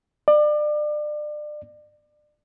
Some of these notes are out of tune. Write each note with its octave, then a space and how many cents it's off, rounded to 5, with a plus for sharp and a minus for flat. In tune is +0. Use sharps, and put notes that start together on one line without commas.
D5 +30